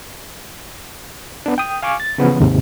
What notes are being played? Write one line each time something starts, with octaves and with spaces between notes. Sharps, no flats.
B3 D4
G5 D#6
F5 G#5 C#6 D6
A6
C#3 E3 F3 B3
D#2 G#2 C3